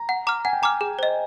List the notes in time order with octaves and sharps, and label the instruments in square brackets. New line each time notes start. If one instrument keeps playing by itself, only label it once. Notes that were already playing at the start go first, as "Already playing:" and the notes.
Already playing: [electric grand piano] A#5
[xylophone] F#5
A#5 D6 F6
[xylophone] F#5 [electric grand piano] G#5
[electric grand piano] G5
[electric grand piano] G#5 [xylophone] A#5 D6 F6
[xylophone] G#4
C5 D#5